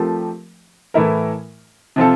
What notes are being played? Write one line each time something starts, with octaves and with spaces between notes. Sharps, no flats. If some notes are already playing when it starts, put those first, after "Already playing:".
Already playing: F3 A3 C4 G4 A#4
A2 E3 A3 E4 A#4
C3 F3 C4 F4 A4